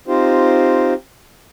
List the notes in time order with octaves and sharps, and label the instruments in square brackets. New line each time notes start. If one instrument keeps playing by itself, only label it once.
[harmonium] C4 D#4 F4 G4 C5